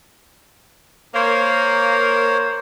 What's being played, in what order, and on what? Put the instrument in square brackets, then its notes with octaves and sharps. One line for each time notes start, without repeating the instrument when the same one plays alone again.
[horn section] A#3 [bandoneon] C5 C#5